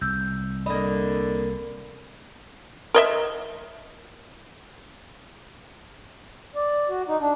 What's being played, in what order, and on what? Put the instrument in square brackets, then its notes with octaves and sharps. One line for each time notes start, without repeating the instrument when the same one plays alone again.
[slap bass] C2 [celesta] E6 G6
[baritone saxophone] D3 [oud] A#3 D#5 [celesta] B5
[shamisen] A#4 D#5 E5
[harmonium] D5
F#4
D#4
D4